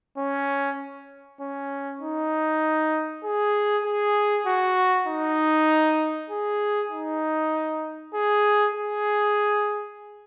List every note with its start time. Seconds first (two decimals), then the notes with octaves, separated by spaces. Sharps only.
0.18 C#4
1.41 C#4
2.01 D#4
3.24 G#4
3.85 G#4
4.46 F#4
5.08 D#4
6.30 G#4
6.91 D#4
8.14 G#4
8.75 G#4